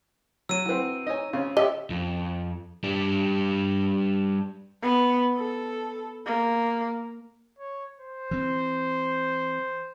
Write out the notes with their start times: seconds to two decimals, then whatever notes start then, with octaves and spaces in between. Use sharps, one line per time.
0.49 F#3 E6 D#7
0.66 E3 F#3 C4 B4
1.07 D#4 C#5 D#5 G#5
1.33 C#3 F4 C#5
1.57 F4 G4 C#5 D#5 E5
1.90 F2
2.84 G3 D4
4.83 B3
5.37 A4
6.26 A#3
7.59 C#5
8.00 C5
8.31 E3 C4